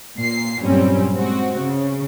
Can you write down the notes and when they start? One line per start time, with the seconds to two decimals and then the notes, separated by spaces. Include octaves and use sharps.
0.18 A#2 C7
0.62 G2 A#2 F#3 G3 C4 C#4
1.16 G#3 C4 F#4
1.60 C#3